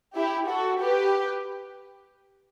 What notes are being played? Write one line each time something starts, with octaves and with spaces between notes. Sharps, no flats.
E4 G4
F#4 A4
G4 B4